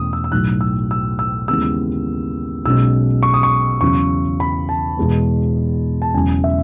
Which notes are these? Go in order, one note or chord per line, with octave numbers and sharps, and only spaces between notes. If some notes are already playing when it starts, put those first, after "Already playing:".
Already playing: E2 B2 A3 C#4 D#6
E6
E6
B1 A2 F#3 F#6
E6
E6
E6
D#2 C#3 E3 G#3 B3 E6
B1 B2 G#3 C#4 E6
C#6
D#6
C#6
E2 C#3 F#3 C#4 C#6
B5
A5
E2 B2 G#3 B3
A5
E1 E2 C#3 F#3 G#5
E5